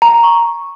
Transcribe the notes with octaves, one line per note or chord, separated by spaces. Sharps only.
A#5
C#6